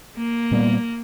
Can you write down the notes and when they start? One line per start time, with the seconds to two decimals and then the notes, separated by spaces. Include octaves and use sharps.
0.17 A#3
0.51 A#2 G3 B3